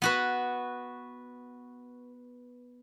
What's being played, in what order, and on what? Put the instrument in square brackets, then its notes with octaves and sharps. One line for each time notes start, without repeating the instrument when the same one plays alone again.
[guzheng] B3 F#4 B4